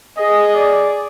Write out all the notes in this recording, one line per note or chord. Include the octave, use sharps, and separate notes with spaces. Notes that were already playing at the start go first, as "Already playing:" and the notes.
G#4 D#5
D5